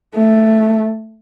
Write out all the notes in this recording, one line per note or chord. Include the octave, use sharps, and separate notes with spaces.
A3